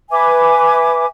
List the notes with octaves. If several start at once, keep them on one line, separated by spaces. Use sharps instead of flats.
B4 E5 G#5 D6